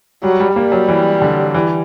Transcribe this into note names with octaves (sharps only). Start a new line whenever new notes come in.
F#3 G3
G3
G3 A#3
F#3
E3
D3
E3